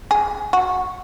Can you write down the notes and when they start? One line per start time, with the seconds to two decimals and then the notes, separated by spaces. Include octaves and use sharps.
0.11 G#4
0.53 F#4